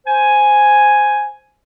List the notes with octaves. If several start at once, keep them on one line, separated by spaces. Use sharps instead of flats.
C5 G#5